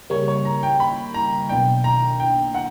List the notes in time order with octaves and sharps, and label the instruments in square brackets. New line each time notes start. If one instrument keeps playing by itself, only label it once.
[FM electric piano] C#3 G3 A#3 C#4 [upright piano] C#5
[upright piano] C#5
A#5
G5
B5
A#5
[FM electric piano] B1 B2 A#3 D4 [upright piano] G5
[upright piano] A#5
G5
F#5